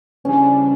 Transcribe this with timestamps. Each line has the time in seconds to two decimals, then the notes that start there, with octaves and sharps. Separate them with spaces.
0.24 C#3 E3 G3 C#4 D4